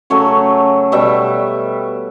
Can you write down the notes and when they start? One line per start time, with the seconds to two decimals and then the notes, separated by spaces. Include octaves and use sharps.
0.10 C#3 F#3 A3 C#5
0.92 B2 G3 E5